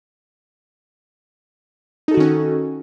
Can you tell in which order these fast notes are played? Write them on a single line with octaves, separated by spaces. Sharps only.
D#4 A4 F#4 D#3 C#4